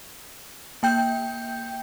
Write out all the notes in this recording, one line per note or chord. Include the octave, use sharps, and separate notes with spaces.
A#3 G5 G6